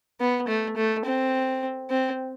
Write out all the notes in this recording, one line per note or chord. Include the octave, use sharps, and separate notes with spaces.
B3
A3
A3
C4
C4